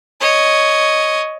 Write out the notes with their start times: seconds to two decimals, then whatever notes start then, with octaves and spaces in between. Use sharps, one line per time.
0.21 C#5 D#5